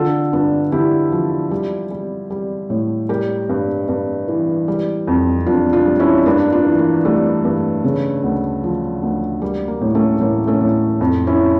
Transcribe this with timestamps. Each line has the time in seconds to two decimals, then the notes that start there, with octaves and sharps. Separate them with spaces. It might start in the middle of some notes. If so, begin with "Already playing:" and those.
Already playing: D3 F4 A4
0.33 G2 D4 F4
0.72 D3 E4 G4
1.12 F3
1.51 G3
1.91 G3
2.30 G3
2.70 A2
3.09 G3 G4 A#4
3.49 G2
3.89 G2
4.28 E3
4.68 G3
5.07 F2
5.46 F2 D4 F4
5.73 D4 F4
5.86 G3
5.99 C#4 E4
6.26 G2 A#3 D4
6.52 D4 F4
6.65 E3
6.79 A#3
7.05 G3 A3
7.45 G2
7.84 C#3
8.24 D2
8.63 F3
9.02 D2
9.42 G3 A#3
9.68 A#3
9.81 A2
9.95 A3 C#4
10.21 A2 A#3
10.47 A3 C#4
10.61 A2
11.01 F2
11.27 C#4 E4